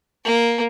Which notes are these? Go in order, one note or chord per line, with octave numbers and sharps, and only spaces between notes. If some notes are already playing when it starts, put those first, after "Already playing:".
A#3